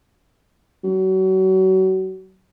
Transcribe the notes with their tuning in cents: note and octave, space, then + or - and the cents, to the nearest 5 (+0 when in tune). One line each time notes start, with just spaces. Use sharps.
F#3 +30